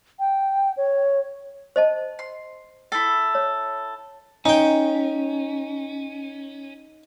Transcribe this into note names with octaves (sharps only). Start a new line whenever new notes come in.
G5
C#5
C5 D#5 A5
C6
E4 A4 G5
C#5
C#4 D#4 G5